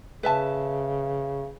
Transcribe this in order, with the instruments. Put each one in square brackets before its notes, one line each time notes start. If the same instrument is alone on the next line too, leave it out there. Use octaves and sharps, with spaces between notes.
[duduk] C#3 [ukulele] B4 E5 A5